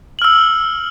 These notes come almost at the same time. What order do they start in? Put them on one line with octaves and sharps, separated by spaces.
F#7 F6 E6